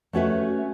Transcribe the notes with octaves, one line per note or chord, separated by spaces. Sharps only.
A3 C#4 F#4 B4 E5